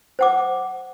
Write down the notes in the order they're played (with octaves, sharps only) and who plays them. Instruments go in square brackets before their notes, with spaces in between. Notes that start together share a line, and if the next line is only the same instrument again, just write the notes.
[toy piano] C5 F#5 D6